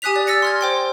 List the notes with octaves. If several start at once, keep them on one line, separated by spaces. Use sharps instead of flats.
G4 G#5 D#6 F#6 B6 F7
D5
E6 A6 A#6 C#7
C6 F6 G#6
C5 G5 C6